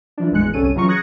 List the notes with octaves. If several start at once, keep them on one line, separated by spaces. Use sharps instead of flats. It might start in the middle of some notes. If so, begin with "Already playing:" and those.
E3 F3 D4
G#1 E2 A2 G#3 F#6 C#7
G1 C2 C#4 A4 D#7
C#3 E3 F#3 F4 A#5 C#6
D#6 F#6 G#6 A#6 C#7